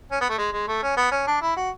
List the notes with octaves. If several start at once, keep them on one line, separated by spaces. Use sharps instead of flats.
C#4
B3
A3
G#3
G#3
A3
C#4
B3
C#4
D4
E4
F#4